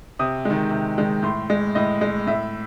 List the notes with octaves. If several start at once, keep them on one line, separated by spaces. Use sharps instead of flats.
C3 D#6
D#3 G#3
C3
D#3 G#3
A2 C6
G#3
A2 D#5
G#3
A2 E5